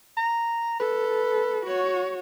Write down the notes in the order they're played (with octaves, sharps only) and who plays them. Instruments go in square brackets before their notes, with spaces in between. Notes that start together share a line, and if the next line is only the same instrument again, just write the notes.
[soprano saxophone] A#5
[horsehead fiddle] A4 [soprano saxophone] B4
[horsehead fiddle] F#4 C#5